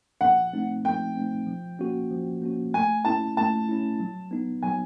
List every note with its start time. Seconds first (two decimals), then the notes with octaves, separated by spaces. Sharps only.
0.21 F3 F#5
0.53 A3 C4 D#4
0.84 F3 G5
1.16 A3 C4 D#4
1.47 F3
1.79 A#3 C#4 F#4
2.11 F3
2.42 A#3 C#4 F#4
2.74 A3 G#5
3.05 C#4 E4 A5
3.37 A3 A5
3.69 C#4 E4
4.00 F#3
4.31 B3 D#4
4.63 F#3 G#5